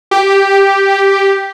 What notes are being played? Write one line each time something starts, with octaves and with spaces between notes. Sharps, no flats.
G4